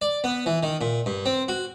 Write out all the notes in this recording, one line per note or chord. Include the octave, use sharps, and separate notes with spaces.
D5
B3
E3
D#3
A#2
G2
C4
F#4